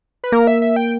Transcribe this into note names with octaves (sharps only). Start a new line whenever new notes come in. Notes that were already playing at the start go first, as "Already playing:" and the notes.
B4
A#3 A#4
E5
E5
G5